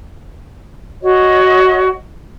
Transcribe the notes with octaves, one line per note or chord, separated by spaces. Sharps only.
F#4 C#5 D#5